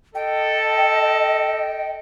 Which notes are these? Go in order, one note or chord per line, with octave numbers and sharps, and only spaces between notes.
A4 D#5 G5